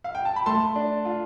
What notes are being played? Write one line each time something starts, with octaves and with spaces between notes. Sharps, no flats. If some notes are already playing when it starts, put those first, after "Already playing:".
F5
G5
A5
B5
A3 A5 C6
D4
F4